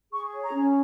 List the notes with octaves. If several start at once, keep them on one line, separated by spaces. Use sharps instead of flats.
G#4 C#6
C#5
A#5
C#4